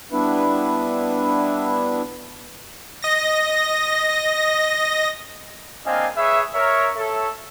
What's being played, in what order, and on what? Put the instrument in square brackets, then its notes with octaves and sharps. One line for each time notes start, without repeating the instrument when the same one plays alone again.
[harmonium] G3 B3 D4 E4 B4 E5
[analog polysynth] D#5 A#6
[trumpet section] A#3 C4 D4 D#5 F5 G#5
G#4 B4 C#5 E5
A#4 C#5 E5
A4 C#5 E5